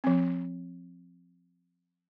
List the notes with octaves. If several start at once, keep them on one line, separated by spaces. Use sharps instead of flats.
F3 C4